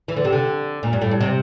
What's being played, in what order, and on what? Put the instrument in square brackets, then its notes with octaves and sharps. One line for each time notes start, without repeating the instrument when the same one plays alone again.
[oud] E3
D3
C3
D3
A#2
G2
A2
G2
C3